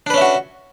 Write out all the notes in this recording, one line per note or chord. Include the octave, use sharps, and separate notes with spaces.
C#4 D4 F#4 B4 E5